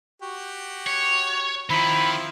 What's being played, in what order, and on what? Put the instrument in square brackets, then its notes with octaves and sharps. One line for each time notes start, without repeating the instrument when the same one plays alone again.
[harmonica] F#4 G4
[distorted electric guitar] C#5
[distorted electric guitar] D#3 [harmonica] F3 C4 E4 [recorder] B5